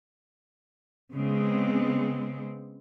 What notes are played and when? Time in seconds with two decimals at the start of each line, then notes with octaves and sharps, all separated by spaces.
1.14 C#3 G#3 B3 C4